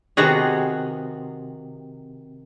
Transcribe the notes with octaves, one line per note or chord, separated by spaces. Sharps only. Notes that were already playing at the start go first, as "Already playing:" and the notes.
C3 D#3 B3 F#4 G#4